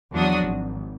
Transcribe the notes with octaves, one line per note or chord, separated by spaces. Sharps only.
E2 F3 F#3 D4 F#4 D#6
G#1